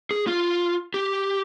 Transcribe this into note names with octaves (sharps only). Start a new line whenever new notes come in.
G#4
F4
G4